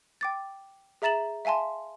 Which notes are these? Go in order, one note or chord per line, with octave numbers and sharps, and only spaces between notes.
G5 D6 A6
G#4 E5 A#5 A6 E7 F#7
E5 F5 G#5 A5 C6